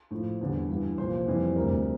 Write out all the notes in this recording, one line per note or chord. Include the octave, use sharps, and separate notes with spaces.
A2 F3
E2 D3 G3
G2 E3 G3
C2 A#2 F3 C5
F2 C3 E3 G3
D2 C3 G3 A#4